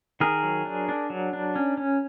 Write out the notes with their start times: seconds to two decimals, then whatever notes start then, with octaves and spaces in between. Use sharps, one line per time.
0.20 D#3 G#4 A#4
0.43 F#3
0.65 D4
0.89 D4
1.10 F#3
1.33 D4
1.56 C#4
1.78 C#4